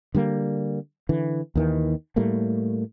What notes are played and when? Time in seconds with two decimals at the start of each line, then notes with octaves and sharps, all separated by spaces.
0.15 D3 G3 A#3
1.09 D3 E3
1.55 D#2 D#3 E3
2.16 A2 G3 A3 A#3